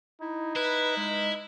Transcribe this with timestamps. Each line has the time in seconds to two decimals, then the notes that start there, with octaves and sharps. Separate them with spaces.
0.21 D#4 E4
0.56 E4 B4
0.97 G#3